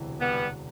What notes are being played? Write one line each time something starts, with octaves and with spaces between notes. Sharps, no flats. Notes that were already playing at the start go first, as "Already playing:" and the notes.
Already playing: E1 D2 C3 E3
G3 B3